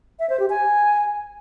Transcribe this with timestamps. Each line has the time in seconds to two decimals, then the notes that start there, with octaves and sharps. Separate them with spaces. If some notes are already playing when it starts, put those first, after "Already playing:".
0.19 E5
0.30 C5
0.40 G4
0.50 G#5